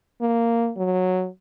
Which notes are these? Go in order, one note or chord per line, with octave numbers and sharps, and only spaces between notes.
A#3
F#3